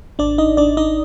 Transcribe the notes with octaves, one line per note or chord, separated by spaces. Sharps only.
G#1 D4 D5
D#4 D#5
G#1 D4 D5
D#4 D#5